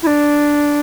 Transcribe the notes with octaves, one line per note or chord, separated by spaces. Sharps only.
E4
D4